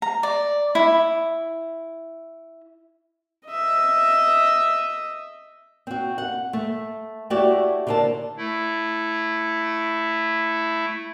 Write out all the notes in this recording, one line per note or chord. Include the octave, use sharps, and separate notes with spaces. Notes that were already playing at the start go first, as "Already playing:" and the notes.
A#5
D5
E4
D#5 E5
C4 F#4
F#5
A3
A3 E4 F#4 G4 C#5 D5
D3 E4 A#4 C5 A5
A3 E4